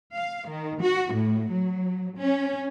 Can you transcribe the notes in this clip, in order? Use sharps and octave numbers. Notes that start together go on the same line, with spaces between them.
F5
D#3
F#4
A2
F#3
C#4